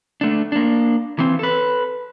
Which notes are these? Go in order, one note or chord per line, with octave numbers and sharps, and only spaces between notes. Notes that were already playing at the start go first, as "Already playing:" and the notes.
A3 D4
A#3 D4
E3 C4
A4 B4